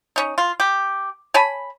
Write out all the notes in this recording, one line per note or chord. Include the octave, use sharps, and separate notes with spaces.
C#4 D#4
F4
G4
C#5 G#5 A5 B5